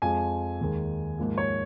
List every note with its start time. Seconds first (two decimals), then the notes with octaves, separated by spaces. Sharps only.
0.02 F2 F3 G#3 G#5
0.61 D#2 D#3 G#3
1.18 G#2 F3 A#3
1.38 C#5